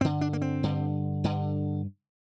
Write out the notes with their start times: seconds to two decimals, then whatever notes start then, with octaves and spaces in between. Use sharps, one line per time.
0.01 G2 C4
0.05 D3
0.21 D4
0.33 A#3
0.42 C4
0.63 G2 D3
1.24 G2 D3